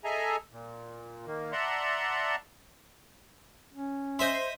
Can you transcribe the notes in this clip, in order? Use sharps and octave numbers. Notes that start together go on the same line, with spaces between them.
G#4 A4 D#5 E5 G#5 A#5
A#2
D#3 A#3
D5 E5 F#5 A5 A#5 C6
C#4
C5 D#5 E5 C6